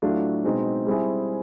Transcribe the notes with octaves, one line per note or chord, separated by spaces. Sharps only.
A2 F#3 A3 D4 F4
B2 G#3 C4 D#4
G3 C4 E4 G#4